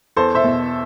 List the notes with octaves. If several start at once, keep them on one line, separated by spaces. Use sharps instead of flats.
E2 A4 C5
C5 E5
B2